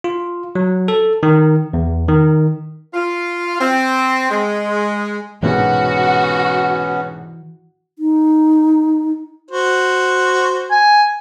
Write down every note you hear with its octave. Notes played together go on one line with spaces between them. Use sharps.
F4
F#3
A4
D#3
E2
D#3
F4
C4
G#3
C2 G#2 B2 E3 B3 C#4 F#4
D#4
F#4 C5
G#5